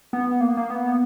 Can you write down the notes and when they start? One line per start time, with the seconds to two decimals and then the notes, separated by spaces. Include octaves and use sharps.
0.13 B3
0.41 A#3
0.57 A#3
0.70 B3